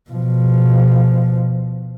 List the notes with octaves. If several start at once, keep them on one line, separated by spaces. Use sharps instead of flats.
B2 F3